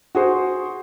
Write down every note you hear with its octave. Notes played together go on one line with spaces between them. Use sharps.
F#4 G#4 C5